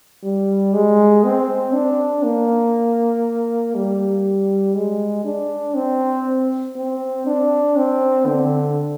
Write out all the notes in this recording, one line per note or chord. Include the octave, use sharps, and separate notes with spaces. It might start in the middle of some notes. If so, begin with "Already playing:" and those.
G3
G#3
C4
D4
A#3
G3
G#3
D4
C4
C4
D4
C4
D3